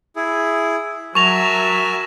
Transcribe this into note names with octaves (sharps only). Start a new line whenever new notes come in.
E4 G#4
F#3 A#4 E5 G#5 A5 C#6 F7